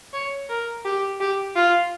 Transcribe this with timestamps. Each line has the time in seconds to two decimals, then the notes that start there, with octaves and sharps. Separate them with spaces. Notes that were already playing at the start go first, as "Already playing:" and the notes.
0.13 C#5
0.49 A#4
0.85 G4
1.20 G4
1.56 F4